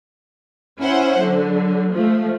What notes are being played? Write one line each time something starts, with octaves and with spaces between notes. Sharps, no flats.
C#4 E4 C5 F#5
D3 F#3
F3 G#3 A3